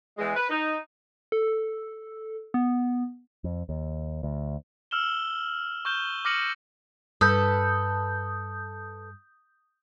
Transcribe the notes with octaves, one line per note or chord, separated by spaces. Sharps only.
E2 E3 G#3
B4
D#4
A4
B3
F2
D#2
D2
E6 F6 E7 G7
C#6 F6 G6 E7 G7
D6 F6 A#6 C#7 D#7 F#7
G2 A4 B4 D#6 G6